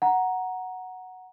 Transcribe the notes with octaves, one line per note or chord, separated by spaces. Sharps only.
F#5 A#5